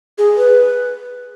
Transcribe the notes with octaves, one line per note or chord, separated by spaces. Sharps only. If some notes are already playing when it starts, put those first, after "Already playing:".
G#4
B4